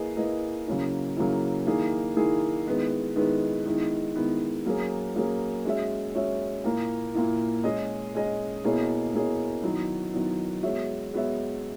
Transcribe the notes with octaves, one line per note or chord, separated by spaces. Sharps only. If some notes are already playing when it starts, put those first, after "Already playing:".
Already playing: A#3 E4 G#4 B4 D#5
A#3 E4 G#4 B4 D#5
C#3 F#3 A#3 C#4 E4
C#3 F#3 A#3 C#4 E4
D#3 A#3 E4 G#4
D#3 A#3 E4 G#4
D#3 G#3 B3 E4 B4
D#3 G#3 B3 E4 B4
D#3 G#3 B3 E4
D#3 G#3 B3 E4
F#3 A#3 C#4 G#4
F#3 A#3 C#4 G#4
G#3 C#4 F#4 C#5 E5
G#3 C#4 F#4 C#5 E5
A#2 A#3 E4
A#2 A#3 E4
G#3 C#4 G#4 D#5
G#3 C#4 G#4 D#5
B2 A#3 E4 G#4 C#5
B2 A#3 E4 G#4 C#5
D#3 F#3 B3 E4
D#3 F#3 B3 E4
G#3 B3 F#4 C#5 E5
G#3 B3 F#4 C#5 E5